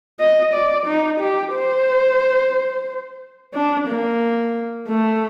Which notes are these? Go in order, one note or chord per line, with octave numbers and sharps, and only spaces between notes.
D#5
D5
D#4
G4
C5
D4
A#3
A3